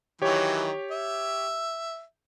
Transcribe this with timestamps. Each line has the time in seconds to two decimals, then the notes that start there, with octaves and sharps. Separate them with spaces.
0.22 D#3 E3 F#3 G4 C#5
0.91 E5